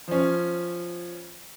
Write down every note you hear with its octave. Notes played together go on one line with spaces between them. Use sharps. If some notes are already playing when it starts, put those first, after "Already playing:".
F3 C#4